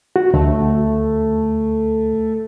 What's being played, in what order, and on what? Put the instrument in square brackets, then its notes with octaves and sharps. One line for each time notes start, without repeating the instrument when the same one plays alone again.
[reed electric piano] F#4
[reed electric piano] D2 [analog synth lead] A3